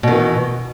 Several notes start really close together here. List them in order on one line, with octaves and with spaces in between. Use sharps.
B2 D#3 E3